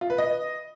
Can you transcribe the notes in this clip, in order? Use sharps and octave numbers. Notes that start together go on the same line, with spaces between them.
F4
B4
D#5